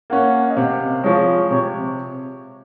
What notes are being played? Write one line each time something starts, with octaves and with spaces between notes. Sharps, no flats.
A#3 C#4 F#5
D#5
C3 F5
F3 G#3 C#5
C3 C#5